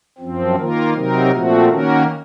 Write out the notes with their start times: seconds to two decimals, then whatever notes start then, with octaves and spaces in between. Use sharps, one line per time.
0.18 F#2 F3 C4
0.55 D#3 A#3 F4 A#4
0.93 C3 F#3 C4 D#4 A#4
1.31 A#2 F3 A3 C4 F#4
1.68 D#3 A#3 C#4 F#4 A#4